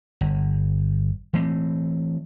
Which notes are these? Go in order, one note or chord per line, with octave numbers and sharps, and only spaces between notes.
G1
E3 A3 C4